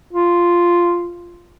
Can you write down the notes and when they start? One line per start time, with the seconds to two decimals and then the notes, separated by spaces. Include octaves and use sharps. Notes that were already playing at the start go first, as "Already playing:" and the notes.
0.13 F4